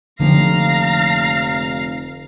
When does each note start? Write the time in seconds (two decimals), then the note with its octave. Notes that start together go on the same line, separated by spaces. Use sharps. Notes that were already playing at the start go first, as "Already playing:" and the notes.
0.20 F1 D3 F3 A#3 F5 G5 A#5